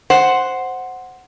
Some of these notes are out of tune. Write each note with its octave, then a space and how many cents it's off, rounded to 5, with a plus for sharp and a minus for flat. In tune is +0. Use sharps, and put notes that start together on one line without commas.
C5 +0 F#5 +0